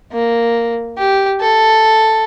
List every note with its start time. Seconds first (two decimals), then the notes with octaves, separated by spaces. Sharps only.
0.12 A#3
0.98 G4
1.40 A4